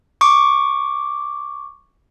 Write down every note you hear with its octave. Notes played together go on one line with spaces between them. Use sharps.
C#6 D6